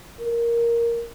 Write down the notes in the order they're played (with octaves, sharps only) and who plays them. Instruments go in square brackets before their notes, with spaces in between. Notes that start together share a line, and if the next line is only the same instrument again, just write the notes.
[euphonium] A#4